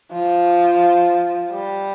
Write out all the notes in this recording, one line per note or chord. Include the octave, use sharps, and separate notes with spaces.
F3
G3